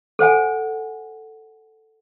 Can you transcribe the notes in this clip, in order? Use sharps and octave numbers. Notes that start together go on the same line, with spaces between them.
A4 C5 F#5 G#5